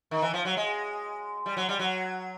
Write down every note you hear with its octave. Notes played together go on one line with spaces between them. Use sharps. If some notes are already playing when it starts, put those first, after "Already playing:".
D#3
E3
F3
F#3
G#3
G3
F#3
G3
F#3